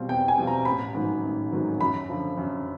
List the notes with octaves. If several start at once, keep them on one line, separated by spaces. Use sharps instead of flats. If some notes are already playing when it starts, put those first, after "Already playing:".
Already playing: B2 G3 C4 F4
E2 G5
G#5
B2 G3 C4 F4
A#5
A1 B5
G#2 D#3 F#3
A1
G#2 D#3 F#3
F#2 B5
D3 F3
F#2